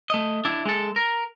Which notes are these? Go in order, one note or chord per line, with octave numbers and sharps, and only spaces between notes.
A3 D#5
D4 E4
G#3 A4
A#4